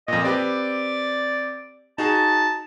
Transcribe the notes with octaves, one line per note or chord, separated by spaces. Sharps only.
F2 A#2 D#5
C4 G4 B4 D5
D#4 F#4 G#4 A5